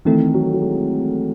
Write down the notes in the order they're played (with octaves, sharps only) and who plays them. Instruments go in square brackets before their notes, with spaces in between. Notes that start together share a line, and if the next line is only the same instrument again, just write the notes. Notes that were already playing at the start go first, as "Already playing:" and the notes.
[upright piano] D#3 [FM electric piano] E3 A3 C4 E4 A4
[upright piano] F#3
F#3
G#3